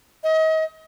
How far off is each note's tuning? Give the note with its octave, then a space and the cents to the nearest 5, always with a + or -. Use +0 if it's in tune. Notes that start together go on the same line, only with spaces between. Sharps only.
D#5 +35